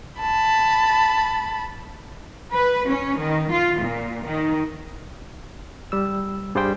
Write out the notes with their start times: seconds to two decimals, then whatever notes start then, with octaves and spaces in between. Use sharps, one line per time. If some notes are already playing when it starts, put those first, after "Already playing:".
0.20 A5 B5
2.53 B4
2.89 C#4
3.18 D#3
3.51 F4
3.81 A#2
4.25 D#3
5.92 G3 E6
6.55 G2 G3 G#4 C5 G5